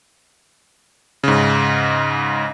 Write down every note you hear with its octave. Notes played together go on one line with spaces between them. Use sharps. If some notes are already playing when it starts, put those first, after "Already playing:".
G#2 C#3